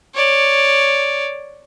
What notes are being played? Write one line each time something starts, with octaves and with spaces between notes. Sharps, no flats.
C#5 D5